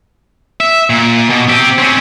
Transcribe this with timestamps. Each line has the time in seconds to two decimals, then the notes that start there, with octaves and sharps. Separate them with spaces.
0.60 E5
0.90 A#2
1.30 B2
1.49 C4 G4
1.78 C4 C#4